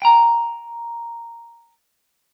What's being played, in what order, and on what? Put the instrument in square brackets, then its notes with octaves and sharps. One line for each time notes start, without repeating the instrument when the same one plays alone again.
[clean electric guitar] G5 A#5